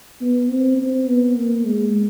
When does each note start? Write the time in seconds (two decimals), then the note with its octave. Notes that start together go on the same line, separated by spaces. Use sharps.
0.21 B3
0.50 C4
0.78 C4
1.07 B3
1.35 A#3
1.64 G#3